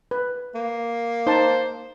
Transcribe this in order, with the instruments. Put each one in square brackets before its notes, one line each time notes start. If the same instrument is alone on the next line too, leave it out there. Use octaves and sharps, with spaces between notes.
[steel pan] B4
[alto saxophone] A#3
[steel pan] D#4 A5 [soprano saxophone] C5